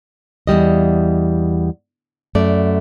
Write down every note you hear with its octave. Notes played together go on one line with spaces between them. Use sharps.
E2 C3 G3 D#5
F#2 A3 D5